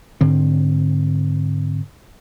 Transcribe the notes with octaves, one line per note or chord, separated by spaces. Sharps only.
G#2 D3 C4